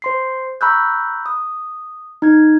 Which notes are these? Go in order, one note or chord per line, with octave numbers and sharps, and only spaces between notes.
C5 C6 C7
A#5 B5 C#6 E6 F#6 G6
D#6
D#4 G#6